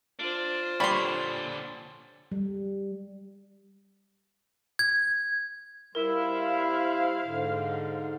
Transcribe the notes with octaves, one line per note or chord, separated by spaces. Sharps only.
D4 F4 C5
A#2 D3 G3 C#5 B5 C6
G3
G#6
G3 E4 A#4 C5 F5
G#2 D3